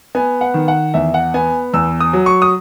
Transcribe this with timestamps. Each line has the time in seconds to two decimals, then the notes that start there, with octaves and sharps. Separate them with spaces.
0.15 B3 G#5
0.41 F#5
0.54 D#3
0.68 F#5
0.94 E2 E5
1.14 F#5
1.34 B3 G#5
1.73 E2 E6
2.00 D#6
2.13 F#3
2.26 C#6
2.42 D#6